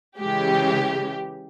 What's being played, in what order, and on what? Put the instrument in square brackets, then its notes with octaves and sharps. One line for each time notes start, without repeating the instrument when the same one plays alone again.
[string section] C#3 E3 G#3 G4